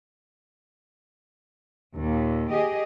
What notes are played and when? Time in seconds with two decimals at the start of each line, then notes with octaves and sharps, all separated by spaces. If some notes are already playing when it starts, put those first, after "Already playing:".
1.97 D#2 A#2
2.51 G4 G#4 D#5